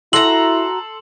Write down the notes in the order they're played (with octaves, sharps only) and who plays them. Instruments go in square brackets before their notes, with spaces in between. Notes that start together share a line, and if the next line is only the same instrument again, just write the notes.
[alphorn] E4 [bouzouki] F#4 A#5 [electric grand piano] A4 C6 E6 [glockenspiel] F#7